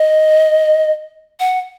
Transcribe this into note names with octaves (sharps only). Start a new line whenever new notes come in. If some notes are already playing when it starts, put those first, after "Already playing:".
Already playing: D#5
F#5